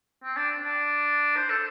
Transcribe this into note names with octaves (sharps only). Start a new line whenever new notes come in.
C4
D4
D4
C5
A4